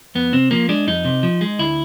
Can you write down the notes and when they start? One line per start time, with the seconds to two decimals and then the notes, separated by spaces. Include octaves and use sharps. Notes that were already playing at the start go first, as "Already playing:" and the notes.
0.15 F2 B3
0.33 C3 C4
0.51 F3 A#3
0.69 G#3 D4
0.87 F2 D#4
1.05 C3
1.23 F3
1.41 G#3
1.59 D2 E4